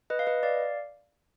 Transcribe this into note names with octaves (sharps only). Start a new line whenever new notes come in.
B4 D#5
F5
B4 D#5
D5 F5